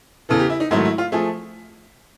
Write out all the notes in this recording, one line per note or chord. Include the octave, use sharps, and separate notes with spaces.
E2 C#3 E3 A4
G4
E4
D#4
G#2 D#3 F#3 A3 E4
E4
F4
F3 A3 G#4